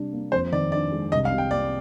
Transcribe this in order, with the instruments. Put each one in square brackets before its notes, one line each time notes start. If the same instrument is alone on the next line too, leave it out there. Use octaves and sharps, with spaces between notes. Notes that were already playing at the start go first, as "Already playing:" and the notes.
Already playing: [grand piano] C3 G3 D4
A#3
[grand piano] F2 [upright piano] C5
[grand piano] D#3 [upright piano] D5
[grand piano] D4 [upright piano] D5
[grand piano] G#3
[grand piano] C2 [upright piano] D#5
[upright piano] F5
[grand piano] C3
[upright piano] G5
[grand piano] A#3 [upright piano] D5